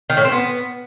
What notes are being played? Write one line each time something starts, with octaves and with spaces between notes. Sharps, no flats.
D#3
A2
C4
B3